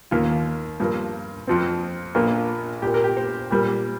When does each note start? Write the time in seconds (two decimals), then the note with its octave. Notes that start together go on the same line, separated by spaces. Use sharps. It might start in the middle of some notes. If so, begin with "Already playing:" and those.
0.11 D#2 D#3 A#3 F4
0.80 G2 F3 A#3
1.47 F2 F3 C4
2.15 A#1 A#2 F3 A#3 F4
2.82 A#2 A#3 G4
2.94 A#4
3.04 G4
3.17 C5
3.51 A#2 G3 A#3